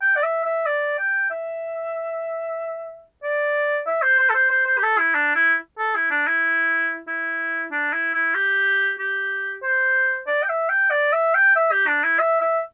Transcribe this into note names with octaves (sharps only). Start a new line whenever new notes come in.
G5
D5
E5
E5
D5
G5
E5
D5
E5
C5
C5
A4
C5
C5
C5
G4
A4
E4
D4
E4
A4
E4
D4
E4
E4
D4
E4
E4
G4
G4
C5
D5
G5
E5
G5
D5
E5
G5
E5
G4
D4
E4
E5
E5